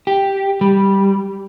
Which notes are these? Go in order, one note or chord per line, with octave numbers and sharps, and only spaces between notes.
G4
G3